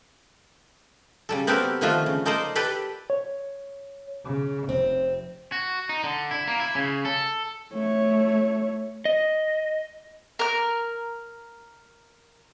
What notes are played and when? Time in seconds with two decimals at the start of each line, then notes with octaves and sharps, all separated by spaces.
1.29 C#3 G3 A4
1.47 B3 C4 F#4 G4 A4 A#4
1.81 D3 D#3 F3 A3 F4 F#4
2.06 C#3
2.26 D#4 A4 A#4 C5 D5 D#5
2.55 G4 A4 B4 D5 G5
3.10 C#5
4.24 C#3
4.69 F1 C4
5.52 F#4
5.89 D#4
6.04 D3
6.31 E4
6.48 A#3
6.60 E4
6.75 C#3
7.05 A4
7.73 A3 C#5
9.05 D#5
10.39 A#4 F6